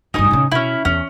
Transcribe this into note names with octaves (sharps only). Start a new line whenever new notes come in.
D2 G2 D#4 G#5 D#6
A#2 C#3
B2 C#4 E4
E2 C#4